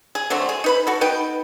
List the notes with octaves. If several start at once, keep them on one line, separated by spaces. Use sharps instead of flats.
G#4
D3 F#3 A3 C4
G#4
D#4 B4 B5
F#4 A4
B3 D#4 B4 G5